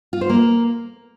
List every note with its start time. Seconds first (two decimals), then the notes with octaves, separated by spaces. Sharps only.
0.13 F4
0.21 C5
0.30 A#3